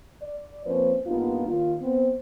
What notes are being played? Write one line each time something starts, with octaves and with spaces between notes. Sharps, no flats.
D5
F3 A#3 C4 C#4 B4 C5
G2 A#3 B3 D#4 F4
D#2 F4
B3 C4